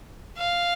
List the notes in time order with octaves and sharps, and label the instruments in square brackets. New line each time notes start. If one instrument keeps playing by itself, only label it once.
[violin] F5